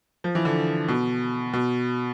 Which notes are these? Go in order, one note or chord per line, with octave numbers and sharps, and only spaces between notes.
F3
E3
D3
B2
B2